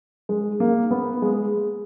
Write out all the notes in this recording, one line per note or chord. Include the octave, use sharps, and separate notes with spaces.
G#3
A#3
B3
G#3